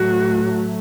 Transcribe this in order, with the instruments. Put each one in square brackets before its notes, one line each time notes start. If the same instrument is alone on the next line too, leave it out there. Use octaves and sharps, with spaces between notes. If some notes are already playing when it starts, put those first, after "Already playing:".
Already playing: [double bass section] A2 F#3 A3 [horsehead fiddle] F#4